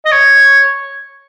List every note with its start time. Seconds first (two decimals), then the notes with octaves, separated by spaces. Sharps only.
0.05 D#5
0.12 C#5